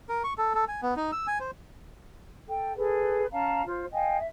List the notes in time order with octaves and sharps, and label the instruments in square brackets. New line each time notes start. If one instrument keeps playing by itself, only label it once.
[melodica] A#4
C#6
A4
A4
G#5
B3
D#4
E6
G#5
C5
[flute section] A4 G5
G#4 A4 B4
C#4 F5 A5 A#5
F4 C5
D#5 F5 G5 G#5
E5